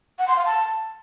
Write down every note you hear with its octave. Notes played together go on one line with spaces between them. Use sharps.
F#5
C6
F5
A5